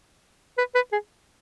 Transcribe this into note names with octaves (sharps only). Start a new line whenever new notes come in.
B4
B4
G#4